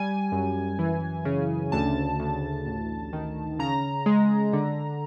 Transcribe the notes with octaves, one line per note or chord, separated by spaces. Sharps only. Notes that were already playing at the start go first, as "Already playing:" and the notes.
Already playing: G3 G#5
F#2
E3
C#3
D2 A5
D2
A1
D#3
C#3 A#5
G#3
D3